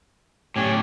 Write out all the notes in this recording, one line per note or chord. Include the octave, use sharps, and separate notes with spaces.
A2 C#4 D4 G4 C#5